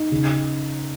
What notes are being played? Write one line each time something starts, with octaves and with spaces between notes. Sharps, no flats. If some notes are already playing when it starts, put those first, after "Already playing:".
Already playing: D#4
C#3